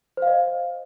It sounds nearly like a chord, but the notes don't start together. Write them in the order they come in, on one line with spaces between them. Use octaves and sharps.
C5 F5 D#5